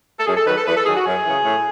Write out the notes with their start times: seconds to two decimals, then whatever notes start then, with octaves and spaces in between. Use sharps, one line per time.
0.19 A4
0.26 F#2 G#4
0.36 A4
0.45 D#3 F#3 B4
0.56 A4
0.66 E2 B4
0.75 A4
0.85 D#3 F#3 G#4
0.95 F#4
1.05 F#2 G#4
1.25 C#3 E3
1.44 A2